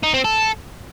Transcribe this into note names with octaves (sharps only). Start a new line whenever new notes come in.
D#4
C4
A4